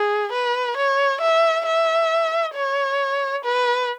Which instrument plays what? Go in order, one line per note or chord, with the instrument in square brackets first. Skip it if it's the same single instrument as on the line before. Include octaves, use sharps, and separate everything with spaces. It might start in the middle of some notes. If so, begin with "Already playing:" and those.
Already playing: [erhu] G#4
B4
C#5
E5
E5
C#5
B4